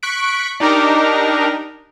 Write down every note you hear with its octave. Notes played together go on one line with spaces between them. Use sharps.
C#6 F#6 B6 D7
D4 D#4 G4 A#4